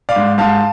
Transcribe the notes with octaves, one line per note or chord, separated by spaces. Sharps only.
D5 F5
G#2
G#2 F5 A5